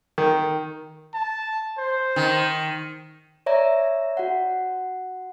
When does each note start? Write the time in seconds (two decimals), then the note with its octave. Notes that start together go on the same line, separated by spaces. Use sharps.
0.18 D#3
1.14 A5
1.78 C5
2.16 D#3
3.46 C#5 D5 E5 A#5
4.17 F#4 F#5